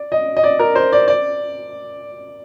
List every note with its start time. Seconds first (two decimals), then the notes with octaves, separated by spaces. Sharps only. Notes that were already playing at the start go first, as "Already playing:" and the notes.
Already playing: D5
0.12 D#5
0.37 D#5
0.44 D5
0.59 A#4
0.75 C5
0.92 D5
1.08 D5